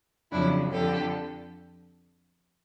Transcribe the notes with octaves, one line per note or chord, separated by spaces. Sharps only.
F2 C#3 F#3 D4 E4
F2 D3 F3 G4 A4